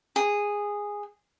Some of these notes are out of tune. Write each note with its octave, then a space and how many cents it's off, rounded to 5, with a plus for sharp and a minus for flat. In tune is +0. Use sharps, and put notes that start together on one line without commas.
G#4 -10